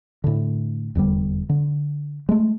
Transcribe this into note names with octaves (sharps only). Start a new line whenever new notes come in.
A2 D3
F1 E2 D3 G3
D3
G#3 A3